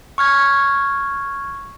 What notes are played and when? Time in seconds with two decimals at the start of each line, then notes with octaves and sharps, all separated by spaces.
0.18 C#6 F6 G#6